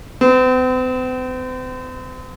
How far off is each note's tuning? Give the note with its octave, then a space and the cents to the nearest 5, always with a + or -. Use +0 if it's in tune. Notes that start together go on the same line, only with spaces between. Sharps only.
C4 -45